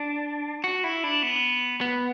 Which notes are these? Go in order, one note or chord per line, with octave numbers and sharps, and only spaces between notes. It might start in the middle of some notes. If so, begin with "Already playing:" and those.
Already playing: D4
F#4
E4
D4
B3
B3